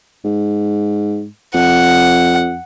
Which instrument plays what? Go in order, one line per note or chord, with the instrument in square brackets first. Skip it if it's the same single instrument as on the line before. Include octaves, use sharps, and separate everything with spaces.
[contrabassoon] G#2
[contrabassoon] F2 [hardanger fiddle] F#5